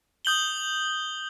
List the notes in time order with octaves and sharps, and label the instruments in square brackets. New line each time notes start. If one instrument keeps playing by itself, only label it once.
[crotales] D#6 G6 F#7 G7